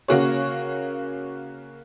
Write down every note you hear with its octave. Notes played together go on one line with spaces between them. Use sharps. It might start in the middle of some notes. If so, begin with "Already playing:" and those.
C#3 A#3 F#4 G#4 C#5